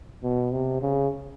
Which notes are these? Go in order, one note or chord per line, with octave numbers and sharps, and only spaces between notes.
B2
C3
C#3